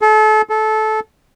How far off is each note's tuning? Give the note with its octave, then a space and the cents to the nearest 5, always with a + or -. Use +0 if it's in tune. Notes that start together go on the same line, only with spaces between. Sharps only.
A4 -35
A4 -20